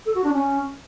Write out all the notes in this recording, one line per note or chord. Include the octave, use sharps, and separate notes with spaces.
A4
F#4
D4
C#4